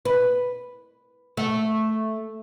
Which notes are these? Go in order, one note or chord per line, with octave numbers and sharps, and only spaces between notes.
B4
A3